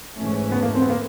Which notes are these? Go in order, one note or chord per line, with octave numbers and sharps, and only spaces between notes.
G#2 E3 A3 C#4
B3
A#3
C4
B3
A#3